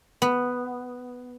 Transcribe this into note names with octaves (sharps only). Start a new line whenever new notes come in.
B3